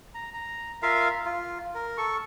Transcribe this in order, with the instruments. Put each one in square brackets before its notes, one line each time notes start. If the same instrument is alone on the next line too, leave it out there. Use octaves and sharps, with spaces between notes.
[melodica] A#5
A#5
F4 A#4 E5 F5
F4
A#4
A4 C#6